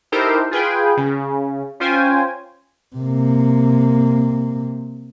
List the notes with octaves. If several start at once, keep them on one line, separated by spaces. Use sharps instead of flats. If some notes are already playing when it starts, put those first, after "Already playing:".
D#4 E4 G4 A4 A#4 C5
F4 G#4 B4 G5
C#3
C#4 F4 C5 G5 G#5
C3 A#3